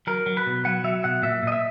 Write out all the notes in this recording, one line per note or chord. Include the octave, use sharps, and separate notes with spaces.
F#3 A#4
F#3
B4
B2
F#3 F#5
F#3 E5
B2 F#5
A#2 E5
A#2 D#5
E5